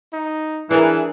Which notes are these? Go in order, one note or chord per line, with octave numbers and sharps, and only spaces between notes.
D#4
E3 D4 G#4 A#4